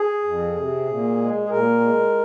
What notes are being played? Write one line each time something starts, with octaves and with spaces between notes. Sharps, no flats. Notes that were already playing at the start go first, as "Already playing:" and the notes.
Already playing: G#4
F2
C3
A#2
G#3
G#4
A#2 A#4
G#3